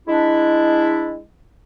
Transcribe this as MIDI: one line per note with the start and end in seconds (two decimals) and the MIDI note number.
0.07 1.20 56
0.07 1.20 62
0.07 1.20 64